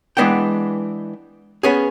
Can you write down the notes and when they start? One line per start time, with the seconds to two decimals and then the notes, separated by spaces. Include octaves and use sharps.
0.17 E3 G#3 B3 D4 F#5 G5
1.63 B3 C#4 G#4